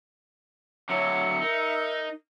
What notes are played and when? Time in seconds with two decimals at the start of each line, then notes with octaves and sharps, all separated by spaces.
0.90 D3 F#3 C#5 E5 C#7
1.42 D#4 A#4